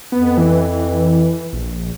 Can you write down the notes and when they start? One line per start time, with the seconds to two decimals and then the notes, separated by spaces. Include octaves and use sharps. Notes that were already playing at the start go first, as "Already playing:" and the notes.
0.12 F2 B3
0.38 E3
1.53 A#1